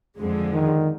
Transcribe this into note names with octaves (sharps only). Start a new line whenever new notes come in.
F2 D3 F3 G#3
D#3